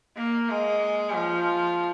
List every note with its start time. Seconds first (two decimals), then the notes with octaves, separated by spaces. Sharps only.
0.16 A#3
0.50 G#3
1.15 F3